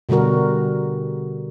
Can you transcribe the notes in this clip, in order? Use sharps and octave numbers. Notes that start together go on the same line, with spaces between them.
B2 D3 G3 F#4 A#4